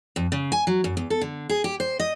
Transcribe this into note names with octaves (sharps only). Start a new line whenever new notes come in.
F2
C#3
G#5
F#3
F#2
E2
A4
D3
G#4
G4
C5
D#5